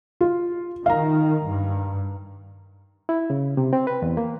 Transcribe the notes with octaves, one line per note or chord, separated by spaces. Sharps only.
F4
D#3 F5 A#5
G2
E4
C#3
C3
C4
B4
E2
A#3